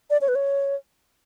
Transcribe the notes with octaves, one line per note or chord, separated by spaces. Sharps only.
D5
C#5
B4
C#5